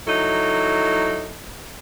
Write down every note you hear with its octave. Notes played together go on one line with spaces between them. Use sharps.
F#3 D#4 E4 A4